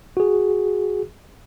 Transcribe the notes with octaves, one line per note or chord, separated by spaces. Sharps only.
F#4 G#4